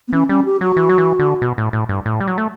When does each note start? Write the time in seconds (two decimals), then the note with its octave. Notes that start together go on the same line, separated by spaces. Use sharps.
0.08 B3
0.13 E3 C#4
0.29 G3 C#4
0.45 G4
0.61 F#3 F#4
0.76 E3
0.89 F#3
0.98 E3
1.19 D3
1.42 B2
1.58 A2
1.73 A2
1.89 G2
2.06 A2
2.20 G3
2.27 F#3
2.38 A3